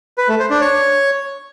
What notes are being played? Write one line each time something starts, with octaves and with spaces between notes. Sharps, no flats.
B4
A3
C5
D4
C#5